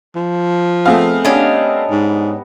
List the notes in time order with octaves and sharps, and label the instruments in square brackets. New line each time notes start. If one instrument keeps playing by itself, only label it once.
[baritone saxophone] F3
[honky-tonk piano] A3 C4 F5 [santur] B3 G#4 E5
[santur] G3 B3 D#5 [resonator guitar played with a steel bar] C#4 D4
[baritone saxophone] G#2